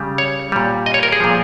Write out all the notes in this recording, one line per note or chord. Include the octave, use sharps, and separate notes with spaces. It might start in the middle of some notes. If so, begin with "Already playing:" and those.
Already playing: C#3 G3
C#5
A#2 G3
D#5
C#5
A#4
G#4
A#2 F3